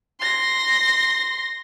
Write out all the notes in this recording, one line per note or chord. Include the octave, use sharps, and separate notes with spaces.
C6 A#6